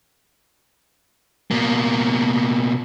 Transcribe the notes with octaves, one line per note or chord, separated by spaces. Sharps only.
B2 A#3